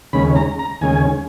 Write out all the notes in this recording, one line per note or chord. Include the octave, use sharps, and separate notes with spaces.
D#2 C#3 G#3 C#4 B5
A#5
A#5
D#2 C#3 G#3 C#4 G#5